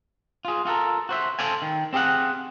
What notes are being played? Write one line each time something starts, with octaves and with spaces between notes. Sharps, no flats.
F4 G#4
F4 F#4 A4 A#4
F#4 C5 E5
A4 C5 D5 F5 G#5
D#3
C4 G4 G#4 F5 F#5